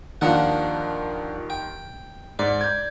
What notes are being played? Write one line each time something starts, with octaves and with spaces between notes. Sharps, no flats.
D#2 D#3 F3 D4 F#5
G5
G#2 D5
G6 G#6